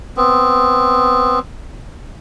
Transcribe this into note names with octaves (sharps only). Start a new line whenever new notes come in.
B3 C4